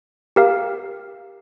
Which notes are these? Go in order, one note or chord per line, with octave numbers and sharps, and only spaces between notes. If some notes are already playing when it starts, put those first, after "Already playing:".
G4 A#4 F5